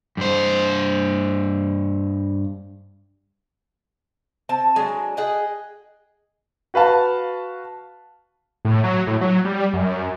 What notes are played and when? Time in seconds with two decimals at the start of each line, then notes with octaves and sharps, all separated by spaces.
0.17 G2 C5
4.49 C4 A5
4.76 F#3 G#3 D4 G#5
5.17 G#4 D#5 F#5 G5
6.74 F#4 B4 F5 A5
8.65 A2
8.84 F#3
9.07 A2
9.21 F#3
9.45 G3
9.73 F#2